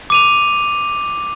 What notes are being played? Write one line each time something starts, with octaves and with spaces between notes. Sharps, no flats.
D6 D#7 F7